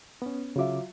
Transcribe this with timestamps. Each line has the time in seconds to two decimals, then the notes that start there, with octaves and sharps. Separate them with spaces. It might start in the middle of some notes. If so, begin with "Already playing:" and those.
0.22 B3 C#4
0.56 C#3 F#3 F4 E5 D6